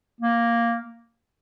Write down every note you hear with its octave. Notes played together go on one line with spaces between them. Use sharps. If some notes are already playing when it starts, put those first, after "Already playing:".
A#3